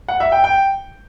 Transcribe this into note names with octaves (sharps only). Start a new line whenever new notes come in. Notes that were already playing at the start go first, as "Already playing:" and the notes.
F#5
E5
G5
G5